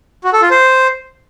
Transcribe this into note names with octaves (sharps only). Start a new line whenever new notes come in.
F#4
A4
F4
C5